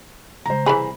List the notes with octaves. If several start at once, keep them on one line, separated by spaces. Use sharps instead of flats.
C#3 G#3 C5 A#5
C2 C3 E3 E4 G#4 B5